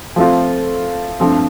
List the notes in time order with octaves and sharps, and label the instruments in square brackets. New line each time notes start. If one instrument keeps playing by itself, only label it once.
[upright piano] F3 A3 C4 F4
G2 F3 A3 C4